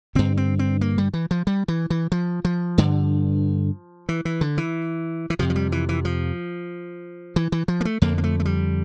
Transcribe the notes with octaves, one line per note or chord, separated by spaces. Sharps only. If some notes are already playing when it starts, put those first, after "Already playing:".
G2 D3 C4
C4
C4
A#3
G3
E3
F3
G3
E3
E3
F3
F3
G2 D3
E3
E3
D3
E3
E3
F2 C3 F3
F3
G3
E3
E3
F3
E3
E3
F3
A#3
A3
F2 D3 A#3
A#3
A3
A3
G3